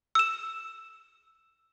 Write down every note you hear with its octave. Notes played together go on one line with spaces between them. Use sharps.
E6 E7